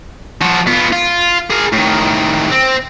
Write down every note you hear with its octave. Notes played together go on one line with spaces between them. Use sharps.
F3 F#4
B3 F4
F4
G#4 A#4
A2 D#3
C4